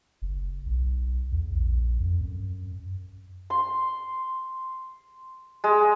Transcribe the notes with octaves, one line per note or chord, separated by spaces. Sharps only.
F#1
B1
E2
A#1
F2
F#2
C6
G#3